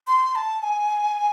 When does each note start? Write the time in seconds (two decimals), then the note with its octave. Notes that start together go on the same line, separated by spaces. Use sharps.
0.08 C6
0.36 A5
0.63 G#5